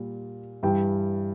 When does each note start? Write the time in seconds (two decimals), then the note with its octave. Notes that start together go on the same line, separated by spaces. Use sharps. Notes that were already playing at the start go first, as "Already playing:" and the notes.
Already playing: A#2 G3
0.63 G2 E3 G3 G5